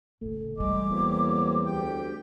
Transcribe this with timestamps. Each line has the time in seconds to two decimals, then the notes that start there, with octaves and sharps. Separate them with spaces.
0.22 A2 C#3 A3
0.57 E3 G3 G#3 D6
0.90 E2 F#3 A#3 C4
1.66 D2 G4 G5